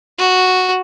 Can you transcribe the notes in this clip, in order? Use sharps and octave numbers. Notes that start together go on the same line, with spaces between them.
F#4